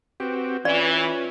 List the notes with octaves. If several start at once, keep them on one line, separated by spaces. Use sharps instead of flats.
C4 F#4 G4 B4
E3 C#4 F4 B4 D5 E5